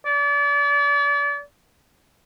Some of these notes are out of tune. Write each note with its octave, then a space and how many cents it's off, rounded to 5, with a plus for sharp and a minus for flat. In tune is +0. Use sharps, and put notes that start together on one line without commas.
D5 -35